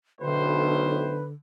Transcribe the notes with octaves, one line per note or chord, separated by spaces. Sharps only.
B1 A2 D3 B4 C5